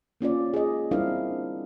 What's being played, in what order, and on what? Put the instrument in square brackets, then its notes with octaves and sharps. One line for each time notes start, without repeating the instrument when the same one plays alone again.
[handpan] A#3 C#4 F4 D5
G#4 D#5
G3 C4 D4 E4 A#4 F5